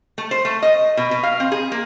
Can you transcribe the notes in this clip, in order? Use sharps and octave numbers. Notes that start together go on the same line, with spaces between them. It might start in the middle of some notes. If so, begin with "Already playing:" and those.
A3
C5
A3
D#5
B2
B2
F5
C4
G#4
A#3